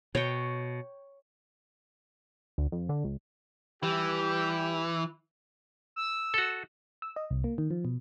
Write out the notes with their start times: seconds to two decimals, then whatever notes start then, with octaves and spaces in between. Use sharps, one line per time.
0.15 B2 C#5 G5
2.58 D2
2.72 F2
2.89 D3
3.05 C#2
3.83 E3 G3 G4
5.96 E6
6.34 F#4 A4
7.02 E6
7.16 D#5
7.30 C2
7.44 A#3
7.58 D#3
7.71 F3
7.85 B2